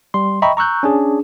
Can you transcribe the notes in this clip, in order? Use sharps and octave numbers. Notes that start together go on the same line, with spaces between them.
G3 C6
D#5 E5 G5 A#5 B5 C#6
A#5 C#6 E6 F#6 G6
C#4 D4 G#4